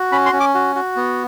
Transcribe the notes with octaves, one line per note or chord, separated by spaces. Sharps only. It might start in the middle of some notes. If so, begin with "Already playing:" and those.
Already playing: F#4
C#4 B5
C6
C#4
D6
F#4
F#4
B3